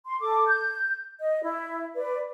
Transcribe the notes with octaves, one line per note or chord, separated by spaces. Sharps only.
C6
A4 D6
G6
D#5
E4 E5
B4 D5